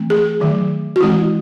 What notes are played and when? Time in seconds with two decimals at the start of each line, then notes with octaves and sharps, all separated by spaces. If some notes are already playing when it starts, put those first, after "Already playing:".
Already playing: E3 A3 C4
0.10 G#4
0.40 D#3 F#3 A3
0.96 F#4
1.01 E3 G#3 C4 E4